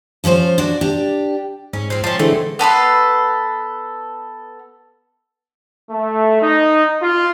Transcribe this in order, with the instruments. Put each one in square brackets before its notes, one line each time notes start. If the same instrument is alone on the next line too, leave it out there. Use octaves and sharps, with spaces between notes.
[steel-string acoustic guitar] F3 C#4 F4 C5
D4 F#4
D4 G4
[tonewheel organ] G#2 [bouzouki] C#4
[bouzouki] F3 C4
[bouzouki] F3 C#4 [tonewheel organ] A5 C6
[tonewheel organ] D3 E3 G#3 [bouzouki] A3 C4
[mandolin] B3 A4 B4 C6
[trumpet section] A3
D#4
F4